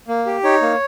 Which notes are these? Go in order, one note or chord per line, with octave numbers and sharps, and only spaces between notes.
A#3
G4
D#4 C#5
A#3